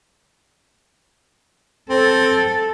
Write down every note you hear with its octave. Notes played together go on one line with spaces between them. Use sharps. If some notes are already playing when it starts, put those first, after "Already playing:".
C4 A4